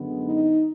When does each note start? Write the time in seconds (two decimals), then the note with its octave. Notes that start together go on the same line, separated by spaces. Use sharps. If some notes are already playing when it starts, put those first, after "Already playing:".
Already playing: F#2 D3 G#3 B3
0.24 D#4